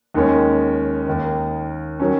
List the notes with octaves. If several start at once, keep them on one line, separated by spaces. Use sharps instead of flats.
D#2 D#3 G#3 C#4
D#2 D#3 A#3
D#3 F#3 C#4